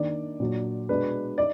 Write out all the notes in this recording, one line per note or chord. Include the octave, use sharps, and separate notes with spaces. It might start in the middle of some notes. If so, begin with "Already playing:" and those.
Already playing: D#3 A#3 D4 D5
A#2 F#3 D4
B2 G#3 D4 B4
D#4 D5